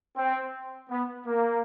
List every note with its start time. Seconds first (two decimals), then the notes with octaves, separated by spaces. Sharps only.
0.15 C4
0.89 B3
1.26 A#3